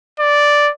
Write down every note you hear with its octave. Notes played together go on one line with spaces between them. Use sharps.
D5